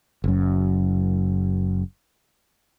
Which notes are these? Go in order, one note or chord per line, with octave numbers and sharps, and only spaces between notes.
F#1 F#2